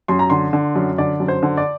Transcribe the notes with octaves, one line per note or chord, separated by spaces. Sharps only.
F#2 C6
A#5
D3 C6
D3
F#2
D3 D5
F#2
C5
D3
D5